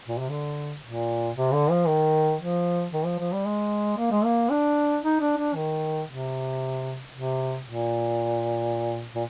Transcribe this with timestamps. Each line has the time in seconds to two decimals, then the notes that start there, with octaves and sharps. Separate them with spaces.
0.08 A#2
0.19 C3
0.30 D3
0.83 A#2
1.35 C3
1.53 D3
1.71 F3
1.88 D#3
2.40 F3
2.93 D#3
3.05 F3
3.19 F3
3.33 G3
3.46 G#3
3.98 A#3
4.11 G#3
4.25 A#3
4.51 D4
5.03 D#4
5.21 D4
5.38 D4
5.55 D#3
6.08 C3
7.14 C3
7.66 A#2
9.15 A#2